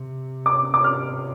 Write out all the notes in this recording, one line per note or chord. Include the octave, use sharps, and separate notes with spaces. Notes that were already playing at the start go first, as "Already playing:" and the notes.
Already playing: C3
D6
D6
F6